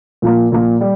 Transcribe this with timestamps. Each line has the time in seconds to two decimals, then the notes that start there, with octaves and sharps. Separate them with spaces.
0.22 A#2 F3 A#3
0.52 A#2 F3 A#3
0.81 G3